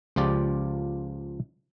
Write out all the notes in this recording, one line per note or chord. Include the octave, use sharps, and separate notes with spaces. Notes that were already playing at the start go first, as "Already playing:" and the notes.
C#2 F3 F4 G4 D5